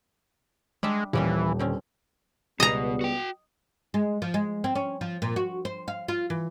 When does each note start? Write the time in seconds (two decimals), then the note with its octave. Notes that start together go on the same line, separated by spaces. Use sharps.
0.83 G3 G#3 D4 E5
1.13 D#1 E3 F3 G3 C#4
1.59 D3 C4 C#4
2.60 C#2 B2 G3 B3 D#5 A#5
3.01 F#4 G5
3.94 G#3
4.22 F3
4.34 G#3
4.64 C4
4.75 C#4
5.01 F3
5.22 A#2
5.36 F#4
5.65 C5
5.88 F5
6.08 F4
6.30 E3